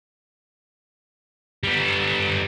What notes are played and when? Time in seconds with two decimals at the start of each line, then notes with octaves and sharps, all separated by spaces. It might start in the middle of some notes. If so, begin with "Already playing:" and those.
1.63 G3 B3